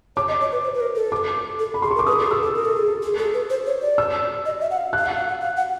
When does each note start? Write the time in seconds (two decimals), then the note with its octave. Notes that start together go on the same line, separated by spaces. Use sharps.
0.16 C#5 D6
0.28 D#5
0.41 C#5
0.52 B4
0.64 C5
0.74 B4
0.80 A#4
0.96 A4
1.12 D6
1.59 A4
1.74 B5
1.82 G#4 C6
1.91 C#6
1.95 A#4
1.99 D6
2.07 B4 D#6
2.13 G#4
2.19 A4
2.26 G#4
2.31 A4 E6
2.43 A4
2.55 A#4
2.65 A4
2.76 G#4
2.87 A4
3.02 G#4
3.18 A4
3.34 B4
3.50 C5
3.67 C#5
3.82 D5
3.98 E6
4.46 D#5
4.61 E5
4.71 F#5
4.77 F5
4.93 F#6
4.98 F5
5.06 F#5
5.17 F5
5.29 F#5
5.41 F5
5.57 F#5